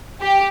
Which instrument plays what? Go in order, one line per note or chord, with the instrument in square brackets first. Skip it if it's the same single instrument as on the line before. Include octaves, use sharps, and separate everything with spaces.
[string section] G4